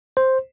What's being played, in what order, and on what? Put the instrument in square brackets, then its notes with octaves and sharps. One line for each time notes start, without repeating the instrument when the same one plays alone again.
[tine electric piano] C5